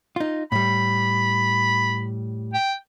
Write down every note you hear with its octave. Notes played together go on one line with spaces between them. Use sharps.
D#4 F4
A2 G3 B5
G5